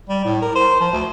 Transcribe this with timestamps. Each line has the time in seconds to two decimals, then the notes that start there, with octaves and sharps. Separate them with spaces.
0.09 G3
0.25 A2
0.42 A#4
0.55 C5
0.80 F3
0.93 D2